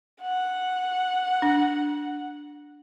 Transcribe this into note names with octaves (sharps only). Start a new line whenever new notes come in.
F#5
D4